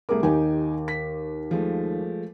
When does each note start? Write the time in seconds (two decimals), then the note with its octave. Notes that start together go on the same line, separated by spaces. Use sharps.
0.09 C2 A3 G#4 A#4 D6
0.23 D#2 D#4 G4 G#5
0.88 B6
1.51 F3 G#3 A3